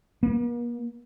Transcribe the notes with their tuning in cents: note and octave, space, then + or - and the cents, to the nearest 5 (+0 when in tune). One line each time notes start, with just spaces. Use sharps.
A#3 +45